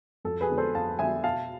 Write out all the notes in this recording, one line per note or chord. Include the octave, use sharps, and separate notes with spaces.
F2 A4
G#4 B4
D3 G#3 B3
A4 C5
F2 F5 A5
D3 G#3 B3 E5 G#5
B2 F5 A5